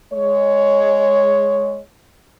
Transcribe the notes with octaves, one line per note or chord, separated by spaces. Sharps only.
G#3 C#5